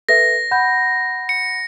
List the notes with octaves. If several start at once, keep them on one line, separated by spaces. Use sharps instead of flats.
A4 B4 E5 A#6
F#5 B5 G6
C#7